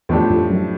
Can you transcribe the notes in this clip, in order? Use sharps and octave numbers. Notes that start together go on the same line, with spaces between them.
E2 A2 F3 A3 D4 G4
F2
F#2